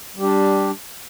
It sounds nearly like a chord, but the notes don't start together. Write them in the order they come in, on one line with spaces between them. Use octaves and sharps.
G3 G4 D4